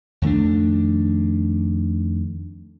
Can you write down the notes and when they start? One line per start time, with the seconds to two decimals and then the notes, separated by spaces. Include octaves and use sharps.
0.22 F2 D#3 A3 D4